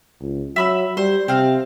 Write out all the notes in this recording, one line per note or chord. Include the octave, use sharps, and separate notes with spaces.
C#2
F#3 E5 B5 E6
G3 C5
C3 C4 F5